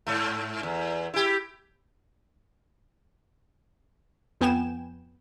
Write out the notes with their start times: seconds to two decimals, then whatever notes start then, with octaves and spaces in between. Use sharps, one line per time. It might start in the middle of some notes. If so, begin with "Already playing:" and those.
0.07 G#2 A3
0.63 E2
1.14 E4 G4
4.41 F2 B3 G5 G#5 E7